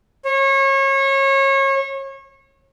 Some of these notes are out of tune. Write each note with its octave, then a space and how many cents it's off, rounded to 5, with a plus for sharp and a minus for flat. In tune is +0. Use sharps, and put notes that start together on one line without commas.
C#5 -30